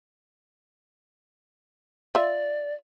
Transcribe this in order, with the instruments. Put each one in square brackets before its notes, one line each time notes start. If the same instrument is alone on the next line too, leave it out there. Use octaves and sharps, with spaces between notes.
[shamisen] F4 E5 [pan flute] D5